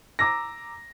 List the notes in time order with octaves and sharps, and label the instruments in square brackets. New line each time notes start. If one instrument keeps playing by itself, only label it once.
[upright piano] A#5 D6 E6 A#6